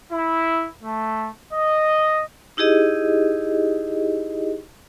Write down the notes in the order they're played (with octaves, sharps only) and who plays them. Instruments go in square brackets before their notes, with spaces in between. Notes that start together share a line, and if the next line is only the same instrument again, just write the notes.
[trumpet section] E4
A3
D#5
[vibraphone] D#4 E4 G4 G#4 D#5